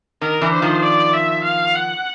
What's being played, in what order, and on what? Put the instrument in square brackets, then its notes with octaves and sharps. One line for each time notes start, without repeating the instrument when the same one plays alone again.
[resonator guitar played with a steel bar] D#3 [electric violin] A#4
[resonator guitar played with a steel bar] D3 E3
[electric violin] C5
[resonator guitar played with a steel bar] D#3 F3
[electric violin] D5
E5
F5
F#5